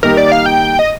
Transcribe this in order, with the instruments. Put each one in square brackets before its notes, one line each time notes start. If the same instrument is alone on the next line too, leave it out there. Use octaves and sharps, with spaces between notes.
[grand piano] D#3 G3 A#3 D#4 G4 [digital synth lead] A#4
[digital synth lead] D5
F5
G5
D#5